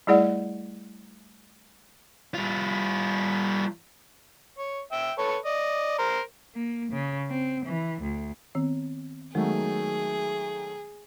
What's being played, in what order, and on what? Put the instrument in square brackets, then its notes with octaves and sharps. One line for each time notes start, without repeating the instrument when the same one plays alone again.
[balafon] G3 A3 E4 G#4 D5 F#5
[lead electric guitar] G3 F4
[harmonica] C#5
E5 G5 E6
A4 B4 C#5
D5 D#5
A#4 C5
[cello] A#3
C#3
C4
E3
D2
[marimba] D#3 B3 C4
[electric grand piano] D#3 F#3 A3 [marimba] G#3 B3 [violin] G#4